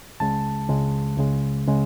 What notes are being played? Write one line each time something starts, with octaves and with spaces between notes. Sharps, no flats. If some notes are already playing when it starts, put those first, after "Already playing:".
C#2 C#3 G#3 A5
C#2 C#3 G#3
C#2 C#3 G#3
C#3 G#3